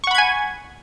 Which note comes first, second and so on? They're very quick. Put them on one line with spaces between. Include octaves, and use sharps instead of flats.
C#6 F#5 B5 G#6 G#5